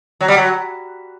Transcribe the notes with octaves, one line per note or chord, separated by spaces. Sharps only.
F#3
G3
F#3